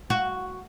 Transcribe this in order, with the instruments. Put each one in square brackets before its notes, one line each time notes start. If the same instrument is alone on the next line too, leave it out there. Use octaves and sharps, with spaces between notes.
[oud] F#4